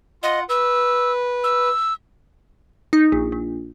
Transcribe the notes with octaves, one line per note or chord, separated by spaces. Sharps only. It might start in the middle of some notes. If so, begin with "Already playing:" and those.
F4 D#5 F#5
B4 E6
E6
D#4
A#1
A#1